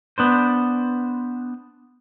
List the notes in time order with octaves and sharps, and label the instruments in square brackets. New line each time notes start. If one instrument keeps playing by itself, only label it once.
[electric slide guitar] B3 D4 C5